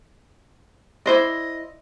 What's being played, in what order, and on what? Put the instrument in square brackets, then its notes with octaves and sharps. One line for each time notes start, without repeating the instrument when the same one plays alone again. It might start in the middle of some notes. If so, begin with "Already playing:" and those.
[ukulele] E4 C5 D5 [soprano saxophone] D#5